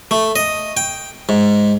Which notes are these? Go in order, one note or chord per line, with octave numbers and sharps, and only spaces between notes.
A3
D#5
G5
G#2